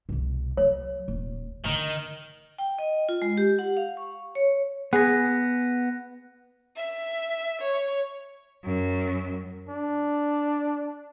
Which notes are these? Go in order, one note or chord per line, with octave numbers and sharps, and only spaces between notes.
C2 B2
F#3 C#5
D#1
D3 D#3
G5
D#5
F4
G#3
G4
F#5
F5
C#6
C#5
B3 G#4 F#6 A#6
E5
C#5
F#2
D4